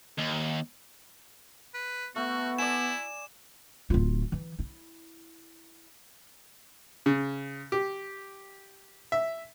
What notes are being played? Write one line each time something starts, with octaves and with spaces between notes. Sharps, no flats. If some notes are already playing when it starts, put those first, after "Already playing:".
D#2
B4
A3 B3 F#4
E4 D5 G#5 E7
D1 F4
E3
E4
C#3
G4
E5